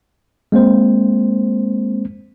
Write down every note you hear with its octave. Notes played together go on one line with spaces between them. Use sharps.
G#3 A#3 C4 C5